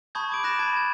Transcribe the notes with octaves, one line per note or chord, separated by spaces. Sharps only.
A5 B5 C#6 D#6 G6 G#6
D6 D7 F#7
B5 F#6 A6 A#6 E7
A5 B5 G#6
G#6